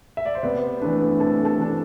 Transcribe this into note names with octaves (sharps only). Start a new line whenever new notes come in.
E5
D5
C5
C3 B3 B4
E3 A3 B3 D4 B4
C3 A4 A5
A4 A5
E3 A3 D4